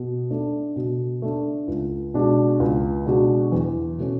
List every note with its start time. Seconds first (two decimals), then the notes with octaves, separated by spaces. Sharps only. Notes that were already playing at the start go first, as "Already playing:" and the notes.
Already playing: B2
0.30 A3 D4
0.76 B2
1.22 A3 D4
1.67 C#2
2.14 B2 G#3 D4 F#4
2.60 C#2
3.06 B2 G#3 D4 F#4
3.52 E2
3.98 B2 A3 C#4